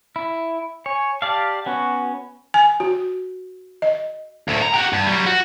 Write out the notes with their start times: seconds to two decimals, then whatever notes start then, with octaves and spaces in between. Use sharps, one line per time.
0.16 E4
0.86 C#5 G#5
1.22 G4 D5 F5 A5
1.66 B3 C#4 F#4
2.54 G#5
2.80 F#4
3.82 D#5
4.48 D2 A2
4.62 A#5
4.74 F#4 G4
4.93 G2
5.07 F#3 G3
5.26 F#4